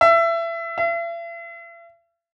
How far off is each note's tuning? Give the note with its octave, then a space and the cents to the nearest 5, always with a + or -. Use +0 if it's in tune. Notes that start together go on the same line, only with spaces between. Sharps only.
E5 +25
E5 +45